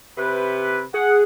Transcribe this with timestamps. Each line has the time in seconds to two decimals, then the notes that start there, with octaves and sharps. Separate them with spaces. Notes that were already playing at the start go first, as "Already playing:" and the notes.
0.18 C3 B4
0.94 G#4 F#5